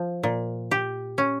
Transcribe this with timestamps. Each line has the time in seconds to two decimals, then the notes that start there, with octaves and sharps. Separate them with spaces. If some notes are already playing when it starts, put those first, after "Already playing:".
Already playing: F3
0.23 A#2
0.71 G4
1.18 C#4